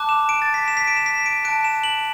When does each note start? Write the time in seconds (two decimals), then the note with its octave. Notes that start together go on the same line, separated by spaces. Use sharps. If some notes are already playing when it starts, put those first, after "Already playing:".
Already playing: A5 D6 F#6
0.09 E7
0.29 D7
0.42 A6
0.54 B6
0.68 E7
0.77 B6
0.87 D7
0.97 E7
1.06 B6
1.26 D7
1.45 A5 F#6 D7
1.65 E7
1.83 F#7